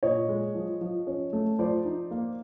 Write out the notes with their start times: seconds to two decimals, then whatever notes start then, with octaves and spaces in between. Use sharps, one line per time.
0.03 A#2 C#5 D#5
0.29 G#3
0.55 F3
0.81 F3
1.07 C#4
1.33 A3
1.59 F3 C5 D5
1.85 D#4
2.11 A#3